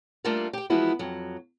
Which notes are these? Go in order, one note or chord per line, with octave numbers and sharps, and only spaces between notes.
G3 A3 A#3 D4 F4 A#4
G4 G5
E3 F3 G#3 B3 E4 F#4
F2 F#3